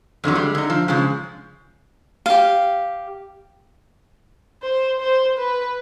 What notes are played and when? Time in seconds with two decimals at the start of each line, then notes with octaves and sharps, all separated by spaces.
0.24 F2 D3 D#3 F#3
0.35 G3 G#3
0.55 D3 D#4
0.70 F3
0.88 C#3 F3 G#3
2.26 G4 F5
4.62 C5
5.00 C5
5.38 B4